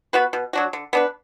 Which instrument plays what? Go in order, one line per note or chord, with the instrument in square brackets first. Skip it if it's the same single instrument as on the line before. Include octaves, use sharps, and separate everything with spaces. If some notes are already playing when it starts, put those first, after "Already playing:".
[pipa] B3 F#4 B4
B2
F#3 D4 F#4
D3
B3 D4 B4